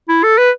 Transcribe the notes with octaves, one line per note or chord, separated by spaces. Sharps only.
E4
A4
B4